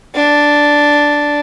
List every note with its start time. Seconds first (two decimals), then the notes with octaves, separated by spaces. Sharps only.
0.15 D4